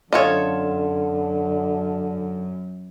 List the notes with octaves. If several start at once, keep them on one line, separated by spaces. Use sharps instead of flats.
F#2 D3 F4 A4 C#5 D#5